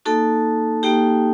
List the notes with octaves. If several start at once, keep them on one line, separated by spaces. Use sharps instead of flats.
A#3 D#4 F#4 A4 A5
A#3 D#4 F#4 G4 G5